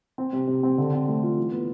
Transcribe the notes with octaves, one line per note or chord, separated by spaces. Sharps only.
C4
C3
C3
C4
D3
C4
A3
F4
E3
B3